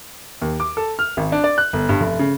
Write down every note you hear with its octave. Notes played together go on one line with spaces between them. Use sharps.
D#2
D6
A4
F6
G#1
D4
D5
F#6
G1
G2
F1
C#3